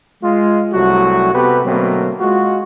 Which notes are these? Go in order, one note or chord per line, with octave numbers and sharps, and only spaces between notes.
G#3 F4
C2 F#3 G3 A3 F#4
C3 B3 F#4 G4 A4 B4
B2 D3 F#3 A3 A#3 C4
G#3 F4 F#4